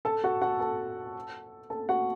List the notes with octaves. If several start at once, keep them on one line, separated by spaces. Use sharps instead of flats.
A4 A5
F#4 F#5
F#4 F#5
A4 A5
A4 A5
F#4 F#5